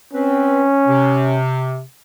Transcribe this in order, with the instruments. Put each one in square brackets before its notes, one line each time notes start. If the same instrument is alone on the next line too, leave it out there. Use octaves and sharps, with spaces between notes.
[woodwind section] C4 B4 [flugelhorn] C#4
[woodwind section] C3